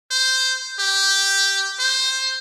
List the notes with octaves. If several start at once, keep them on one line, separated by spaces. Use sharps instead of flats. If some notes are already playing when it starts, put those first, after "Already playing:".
C5
G4
C5